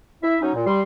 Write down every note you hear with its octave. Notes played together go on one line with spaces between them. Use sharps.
E4 E5
F#3 C#4 D#4
A#2
G3 C6